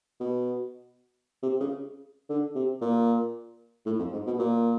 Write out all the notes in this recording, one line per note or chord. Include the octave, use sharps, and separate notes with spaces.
B2
C3
C#3
D3
C3
A#2
A2
F2
G#2
B2
A#2